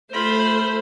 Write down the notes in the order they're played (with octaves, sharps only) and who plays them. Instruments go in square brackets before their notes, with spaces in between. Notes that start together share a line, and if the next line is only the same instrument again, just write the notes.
[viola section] A3 C5 [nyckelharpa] F4 B5